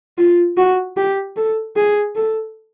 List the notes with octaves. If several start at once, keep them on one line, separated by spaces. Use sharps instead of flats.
F4
F#4
G4
A4
G#4
A4